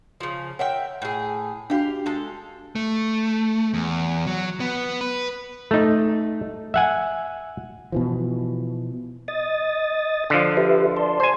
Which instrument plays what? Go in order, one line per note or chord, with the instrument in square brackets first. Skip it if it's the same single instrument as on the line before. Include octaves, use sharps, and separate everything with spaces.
[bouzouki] C#3 F3
[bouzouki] A#4 E5 G5 [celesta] C#5 F#5
[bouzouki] A2 G#4
[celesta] D4 F#4 [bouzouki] G4 F5
[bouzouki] G#3 A4
[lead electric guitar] A3
E2
F#3
B3
B4
[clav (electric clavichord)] A3 D#4
E5 F#5 G#5
[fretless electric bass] B2 E3 F3
[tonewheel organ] D#5 D#6 A6
[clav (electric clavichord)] D3 F3
[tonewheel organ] G4 B4 E5
D5 A5 C6
[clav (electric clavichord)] C5 G#5